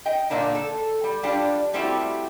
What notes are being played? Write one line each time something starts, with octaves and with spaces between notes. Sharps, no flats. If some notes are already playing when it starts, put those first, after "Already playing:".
D#5 G5
A#2 D3 A#3 D4 D#4
A4
G3
G3 D4 F4 G4
G3 A3 C4 E4 F#4 G4